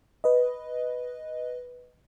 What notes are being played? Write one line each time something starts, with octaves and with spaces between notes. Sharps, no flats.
B4 D#5